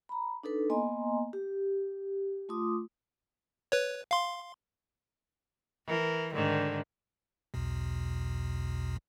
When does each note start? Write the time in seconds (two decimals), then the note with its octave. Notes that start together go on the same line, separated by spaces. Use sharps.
0.09 A#5 B5
0.43 D4 D#4 A4 B4
0.70 A#3 B3 D#5 G#5 A#5 C6
1.33 G4
2.49 A3 F4 C6 D6 D#6
3.72 B4 C#5
4.11 F5 C6
5.86 E3 A#4
6.33 G#2 D3 D#3
7.54 B1 E2 B2